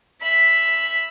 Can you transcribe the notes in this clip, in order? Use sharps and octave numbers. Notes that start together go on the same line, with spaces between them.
E5 B5